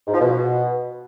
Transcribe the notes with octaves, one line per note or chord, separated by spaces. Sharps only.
G#2
F3
B2